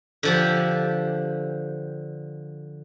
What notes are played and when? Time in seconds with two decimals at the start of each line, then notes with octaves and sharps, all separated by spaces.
0.23 D3 F3 G4